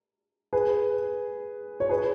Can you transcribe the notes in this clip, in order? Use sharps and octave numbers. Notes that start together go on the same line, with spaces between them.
G#4 B4
C#5
G#4 B4